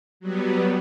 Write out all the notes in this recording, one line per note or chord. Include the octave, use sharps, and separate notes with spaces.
F#3 G3 B3